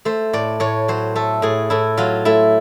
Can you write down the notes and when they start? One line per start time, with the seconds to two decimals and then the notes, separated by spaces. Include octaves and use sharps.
0.05 A3 C5
0.33 A2 D5
0.60 A2 C#5
0.88 F#3 C5
1.16 A3 A4
1.42 A2 G#4
1.70 A2 E4
1.97 F#3 F4
2.25 A3 E4